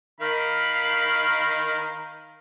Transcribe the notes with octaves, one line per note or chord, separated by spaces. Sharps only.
D#3 A#4 F5 B5